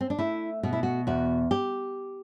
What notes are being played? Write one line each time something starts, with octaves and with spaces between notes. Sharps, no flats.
C4
D4
A3 E4
B2 F#4
E4
F#4
E2 F#4
G4